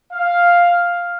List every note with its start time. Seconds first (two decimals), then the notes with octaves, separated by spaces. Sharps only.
0.13 F5